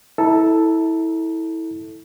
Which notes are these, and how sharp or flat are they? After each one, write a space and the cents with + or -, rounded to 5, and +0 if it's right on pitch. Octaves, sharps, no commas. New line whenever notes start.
E4 -20 A4 +0 A#5 +35